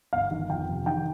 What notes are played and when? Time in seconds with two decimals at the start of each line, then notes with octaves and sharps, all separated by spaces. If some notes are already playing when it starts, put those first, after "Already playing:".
0.13 G1 F5
0.31 D#3
0.49 F2 G5
0.69 C3
0.86 D#3 G5